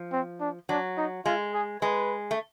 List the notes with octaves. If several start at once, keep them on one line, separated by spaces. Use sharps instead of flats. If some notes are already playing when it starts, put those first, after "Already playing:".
Already playing: F3
C4
D4
F#3 D4
D#4
G#3 F4
G#4
G#3 B4
A3